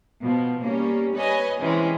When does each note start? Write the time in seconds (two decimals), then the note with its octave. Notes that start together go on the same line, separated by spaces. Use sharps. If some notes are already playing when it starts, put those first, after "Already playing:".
0.22 B2 F3
0.63 G3 A#3 C#4
1.15 B4 C#5 D#5 G#5
1.60 C3 E3 G#3 C#4